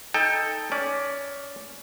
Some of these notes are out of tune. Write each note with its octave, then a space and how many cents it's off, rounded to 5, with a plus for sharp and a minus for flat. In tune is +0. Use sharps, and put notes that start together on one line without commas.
D#4 +5 A4 +0 G5 +25
C#4 +20 D5 +0